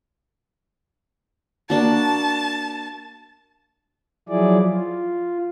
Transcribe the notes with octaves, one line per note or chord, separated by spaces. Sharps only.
A#3 D4 F#4 A5
F3 F#3 E4 G#4 D5
F4